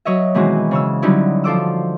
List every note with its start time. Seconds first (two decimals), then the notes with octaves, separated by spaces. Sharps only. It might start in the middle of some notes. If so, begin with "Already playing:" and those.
0.05 F#3 C#5 D#5 E5
0.34 B2 D#3 E3 G#3 C4 F#4
0.71 C#3 C#5 E6
1.02 D3 F#3 G3 C#4 D#4 E4
1.44 F3 A4 C5 D6 E6